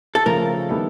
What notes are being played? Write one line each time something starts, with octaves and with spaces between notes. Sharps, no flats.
A4
C#3 F3 A3 A#4
D#3 G3 B3 E4 A4